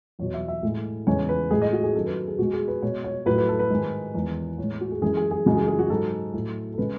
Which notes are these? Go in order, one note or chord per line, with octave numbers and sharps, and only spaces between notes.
E2 B2 F#3 C#5
E5
E5
A2 G#3
E2 C#3 G#3 C#5
B4
A2 G#3 G#4
D#5
F#4
G#4
F#2 D#3 F#3 A4
B4
G#4
B2 G#3 F#4
G#4
B4
B2 G#3 C#5
C#5
A2 F#3 B4
B4
A4
B4
G#2 D#3 G#3
E2 D#3 G#3
A2 G#3 C#5
F#4
G#4
F#2 E3 G#3 G#4
G#4
G#4
F#2 C#3 E3 G#3 F#4
G#4
G#4
F#4
G#2 F#3 A4
A2 F#3
A4
C#3 G#3 B4